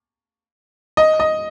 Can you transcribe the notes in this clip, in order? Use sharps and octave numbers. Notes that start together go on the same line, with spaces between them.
D#5
D#5